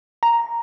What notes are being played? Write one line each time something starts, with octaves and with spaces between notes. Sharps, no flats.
A#5